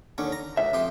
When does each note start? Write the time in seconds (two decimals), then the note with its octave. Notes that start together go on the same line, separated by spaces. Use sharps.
0.18 D#2 D3 C#4
0.32 A#5
0.57 C#2 E5
0.73 F2 G4 C6